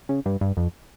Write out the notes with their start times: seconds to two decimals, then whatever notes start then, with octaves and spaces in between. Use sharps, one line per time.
0.09 C#3
0.26 G2
0.41 G2
0.57 F2